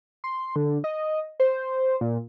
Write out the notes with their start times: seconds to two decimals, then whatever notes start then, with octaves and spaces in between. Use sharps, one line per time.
0.24 C6
0.56 D3
0.84 D#5
1.40 C5
2.01 A#2